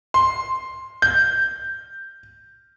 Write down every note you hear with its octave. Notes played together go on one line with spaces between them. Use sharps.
C6
G6